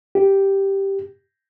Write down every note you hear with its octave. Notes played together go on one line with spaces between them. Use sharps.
G4